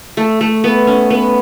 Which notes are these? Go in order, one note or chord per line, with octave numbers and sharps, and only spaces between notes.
A3
A3
B3
C#4
B3